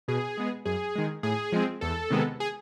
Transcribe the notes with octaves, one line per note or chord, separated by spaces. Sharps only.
B2 G#4
G#3 B3
F#2 G#4
D#3 G#3
A2 G#4
F3 G#3 C4
E2 A4
C3 D#3 G#3 B3
G#4